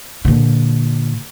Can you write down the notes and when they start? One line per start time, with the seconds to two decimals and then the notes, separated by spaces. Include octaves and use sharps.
0.25 A#2 D3